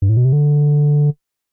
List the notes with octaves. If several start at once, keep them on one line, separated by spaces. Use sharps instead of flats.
G2
A2
B2
C3
D3